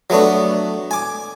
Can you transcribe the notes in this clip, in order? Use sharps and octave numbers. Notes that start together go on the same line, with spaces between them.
F#3 A3 B3 D4
G#5 D6